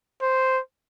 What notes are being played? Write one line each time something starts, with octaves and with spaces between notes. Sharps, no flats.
C5